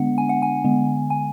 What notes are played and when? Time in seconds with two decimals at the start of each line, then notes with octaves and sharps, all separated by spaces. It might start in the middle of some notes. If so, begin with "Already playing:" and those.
Already playing: D3 G#3 B3 D4 F#5
0.18 G#5
0.29 F#5
0.42 G#5
0.64 D3 G#3 B3
1.10 G#5